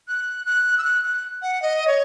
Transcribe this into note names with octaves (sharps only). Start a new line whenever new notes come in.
F#6
F#6
E6
F#6
F#6
F#5
D#5
C#5